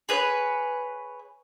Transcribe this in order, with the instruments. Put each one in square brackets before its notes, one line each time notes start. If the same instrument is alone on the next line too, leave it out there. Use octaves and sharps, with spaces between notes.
[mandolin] G#4 B4 C#5